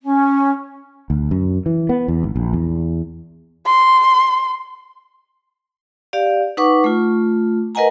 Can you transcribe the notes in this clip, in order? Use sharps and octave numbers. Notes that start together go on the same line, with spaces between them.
C#4
D2
F#2
E3
B3
E2
G#1
A#1
E2
C6
G4 D5 F5
D#4 B4 F#5 C#6 D6
A3 F4
A#4 B4 D#5 F#5 G#5 A#5